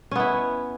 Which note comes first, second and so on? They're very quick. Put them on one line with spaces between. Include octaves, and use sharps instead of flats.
C#4 B3 E4